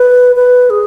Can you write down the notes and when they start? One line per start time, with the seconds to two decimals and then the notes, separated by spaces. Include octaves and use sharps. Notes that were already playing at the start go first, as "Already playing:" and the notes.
Already playing: B4
0.36 B4
0.70 G#4